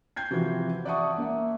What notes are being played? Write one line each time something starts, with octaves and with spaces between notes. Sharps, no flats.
G5 G6 G#6 C7
C3 E3 F3 C4 F#4
D5 E5 F#5 A5 C#6 D#6
A#3 E5